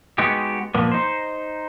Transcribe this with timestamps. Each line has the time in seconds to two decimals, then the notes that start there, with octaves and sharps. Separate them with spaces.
0.18 G#3 B3 D#4 F#4 G4
0.74 A#2 F3 A#3 B3
0.92 D#4 C5